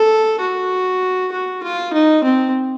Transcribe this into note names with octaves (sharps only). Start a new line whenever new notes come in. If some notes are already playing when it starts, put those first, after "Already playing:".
Already playing: A4
F#4
F#4
F4
D#4
C4